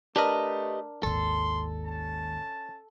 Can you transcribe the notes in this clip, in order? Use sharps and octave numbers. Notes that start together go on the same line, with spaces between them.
A3 D4 G4 A#4 B4 D#5
G#1 D#2 A4 C6
C#4 A5